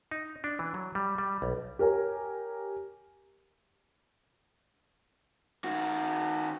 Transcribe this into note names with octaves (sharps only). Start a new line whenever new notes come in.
D#4
D4
E3
F#3
G3
G3
B1
G4 A#4 C#5 G#5
D#3 F#4